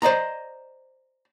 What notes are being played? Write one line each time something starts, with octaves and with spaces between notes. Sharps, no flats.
C5 D5 D#5 A#5